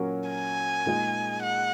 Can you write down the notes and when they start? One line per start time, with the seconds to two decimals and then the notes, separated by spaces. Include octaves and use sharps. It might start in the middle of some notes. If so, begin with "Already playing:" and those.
Already playing: A#2 F#3 C#4 F#4 A#4
0.30 G#5
0.86 A#2 G#3 D#4 G#4
1.43 F#5